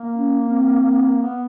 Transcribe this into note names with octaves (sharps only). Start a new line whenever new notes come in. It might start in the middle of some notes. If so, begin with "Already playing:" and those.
Already playing: A#3
C#4
C4
B3
A#3
B3